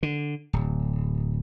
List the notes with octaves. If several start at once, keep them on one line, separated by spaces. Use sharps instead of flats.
D3
D1